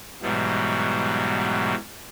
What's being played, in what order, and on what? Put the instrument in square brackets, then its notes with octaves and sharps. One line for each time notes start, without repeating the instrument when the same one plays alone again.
[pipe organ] G#2 B2 E3 F#3 G3